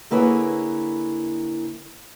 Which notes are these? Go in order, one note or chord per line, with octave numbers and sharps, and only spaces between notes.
D3 A#3 E4 G#4 B4 C#5